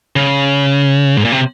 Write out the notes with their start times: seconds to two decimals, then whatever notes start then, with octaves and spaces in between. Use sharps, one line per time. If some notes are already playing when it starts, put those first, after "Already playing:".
0.16 C#3
1.17 G#2
1.25 A#2
1.32 C3